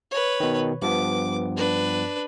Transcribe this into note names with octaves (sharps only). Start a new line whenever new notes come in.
B4 C#5
B2 D#3
G2 F3 B3 D6
D4 B4